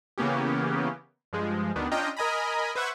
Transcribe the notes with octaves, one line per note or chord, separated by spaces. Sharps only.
C#3 E3 A#3 B3 C#4 G4
G2 F3 G#3
D2 D#3 B3 D4
C#4 D4 F4 D#5 G5 A#5
A#4 D#5 G#5 A#5 B5
B4 C5 E5 F#5 C#6 G#6